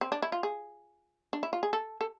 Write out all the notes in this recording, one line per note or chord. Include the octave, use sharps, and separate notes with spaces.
C4
D4
E4
F4
G#4
D4
E4
F4
G#4
A4
A4